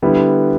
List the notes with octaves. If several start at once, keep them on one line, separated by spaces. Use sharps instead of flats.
D3 G3 B3 E4